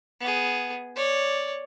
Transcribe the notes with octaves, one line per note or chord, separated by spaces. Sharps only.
B3 G#4
C#5 D5